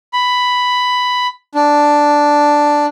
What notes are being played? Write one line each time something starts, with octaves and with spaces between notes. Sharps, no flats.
B5
D4